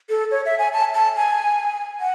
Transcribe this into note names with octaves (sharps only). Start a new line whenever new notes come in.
A4
C#5
E5
G#5
A5
A5
G#5
F#5